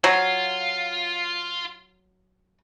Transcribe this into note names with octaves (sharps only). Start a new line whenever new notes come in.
F#3 F4